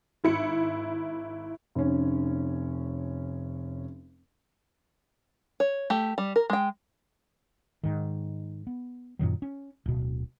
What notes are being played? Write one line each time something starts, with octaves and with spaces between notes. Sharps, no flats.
G#1 E4 C#7
F1 C#4
C#5
A3 G4
G3
A#4
G#3 G5
G#2 D#3
B3
F#2 A#2 D#3 F#3
C#4
D1 B2